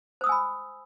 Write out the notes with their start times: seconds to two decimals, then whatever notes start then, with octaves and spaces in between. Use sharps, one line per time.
0.21 C5
0.24 D#6
0.26 E6
0.29 G#5
0.32 B5